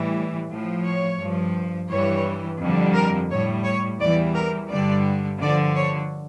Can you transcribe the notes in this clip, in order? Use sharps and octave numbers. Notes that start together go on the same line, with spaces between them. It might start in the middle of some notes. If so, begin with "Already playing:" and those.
Already playing: A2 E3 G3
A2 F3
C#5
G2 F3
G2 E3 G3 C#5
F2 D3 G3
A#4
A2 G3 C#5
C#5
E2 E3 G3 D5
A#4
G2 D3 G3 D5
G2 D3 F3 D5
C#5